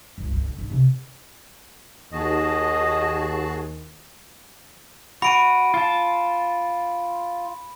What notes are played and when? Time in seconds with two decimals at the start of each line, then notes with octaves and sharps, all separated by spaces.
0.18 C#2 G2
0.32 D2 G2
0.45 D3
0.58 G2 D#4
0.69 C3 D#3
2.13 D#2 F#4 G#4 D#5 A5
5.22 F#4 B5 D7 D#7
5.74 F4 A5